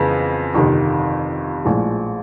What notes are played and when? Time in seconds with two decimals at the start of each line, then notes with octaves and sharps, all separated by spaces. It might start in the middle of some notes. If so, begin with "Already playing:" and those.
Already playing: F2 C#3 E3 G#3 B3
0.54 G1 F2 C3 D#3
1.65 A#1 A2 F3 G#3